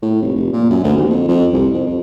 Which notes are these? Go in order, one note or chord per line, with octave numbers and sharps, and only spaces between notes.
A2
F1
F1
A#2
F#2
D2
D#2
F2
F2
C2
F2
F2